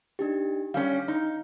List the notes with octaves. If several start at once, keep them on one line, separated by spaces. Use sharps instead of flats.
D4 D#4 G4
G3 C#4 F5
D#4